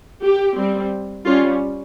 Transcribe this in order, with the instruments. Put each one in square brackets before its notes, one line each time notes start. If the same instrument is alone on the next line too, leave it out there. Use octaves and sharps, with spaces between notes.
[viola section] G4
G3 C4
G3 C#4 F4